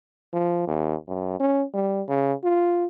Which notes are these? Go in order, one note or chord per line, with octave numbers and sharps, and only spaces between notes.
F3
D#2
F#2
C#4
G3
C#3
F4